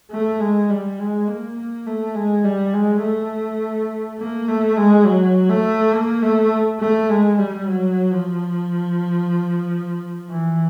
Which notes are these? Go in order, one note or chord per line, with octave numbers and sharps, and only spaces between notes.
A3
G#3
G3
G#3
A#3
A#3
A3
G#3
G3
G#3
A3
A#3
A3
G#3
F#3
A3
A#3
A3
A3
G#3
G3
F#3
F3
E3